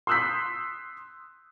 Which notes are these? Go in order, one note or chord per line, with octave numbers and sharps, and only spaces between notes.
C6 D#6 E6 F#6 G6 B6